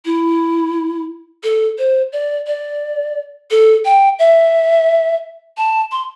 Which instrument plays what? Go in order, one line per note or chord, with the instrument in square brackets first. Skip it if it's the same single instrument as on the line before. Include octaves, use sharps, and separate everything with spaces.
[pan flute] E4
A4
C5
D5
D5
A4
G5
E5
A5
C6